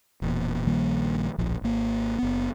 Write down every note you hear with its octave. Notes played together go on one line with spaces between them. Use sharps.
E1 E2 A#2
A#1 D#3 G3 A#3
D1 A#1 F3
G#1 A#3
F#1 B3